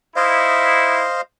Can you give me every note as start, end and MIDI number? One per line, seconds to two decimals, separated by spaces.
0.16 1.04 63
0.16 1.04 64
0.16 1.21 72
0.16 1.21 75
0.16 1.21 77